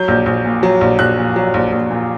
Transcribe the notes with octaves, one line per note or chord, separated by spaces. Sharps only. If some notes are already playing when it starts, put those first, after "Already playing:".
Already playing: F#3 G6
A#1
A#1
A#2
F#3
A#1
A#1 F#6
A#2
F#3
A#1
A#1
A#2